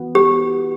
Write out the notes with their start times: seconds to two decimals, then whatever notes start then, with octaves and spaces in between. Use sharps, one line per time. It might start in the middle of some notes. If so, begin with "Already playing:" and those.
Already playing: E3 B3 F#4
0.15 G4